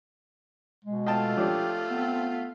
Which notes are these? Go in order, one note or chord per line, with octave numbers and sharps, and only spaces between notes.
B2 G#3
A3 F4 D#5 G5 A5
F3 C#4 D4 G4
B3 C4